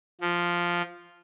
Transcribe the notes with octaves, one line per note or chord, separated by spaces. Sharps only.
F3